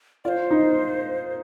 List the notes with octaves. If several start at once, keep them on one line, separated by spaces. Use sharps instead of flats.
F4 D5
C5
D#4